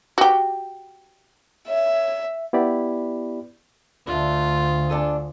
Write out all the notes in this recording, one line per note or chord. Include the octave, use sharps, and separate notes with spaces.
F#4 G4
C#5 E5
B3 E4 G4 D5 B5
D2 D3 A3 F4
D4 A4 G#5